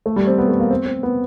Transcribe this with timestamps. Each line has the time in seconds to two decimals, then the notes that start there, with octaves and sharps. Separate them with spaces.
0.06 A3
0.16 G3
0.27 C4
0.38 B3
0.49 A3
0.60 A#3
0.70 C4
0.86 C4
1.03 B3